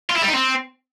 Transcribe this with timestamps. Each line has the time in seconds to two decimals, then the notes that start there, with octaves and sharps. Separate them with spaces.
0.10 F4
0.16 E4
0.22 G3
0.28 D#4
0.34 C4